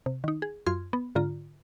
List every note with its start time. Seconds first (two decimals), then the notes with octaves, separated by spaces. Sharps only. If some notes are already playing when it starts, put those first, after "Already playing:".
0.06 C3
0.24 D#3 D#4
0.42 G#4
0.66 F#2 F4 C6 F6 G#6
0.93 B3
1.15 G#2 D3 F4 A#5